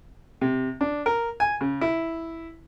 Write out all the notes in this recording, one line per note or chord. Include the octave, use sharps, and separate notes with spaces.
C3
D4
A#4
G#5
C#3
E4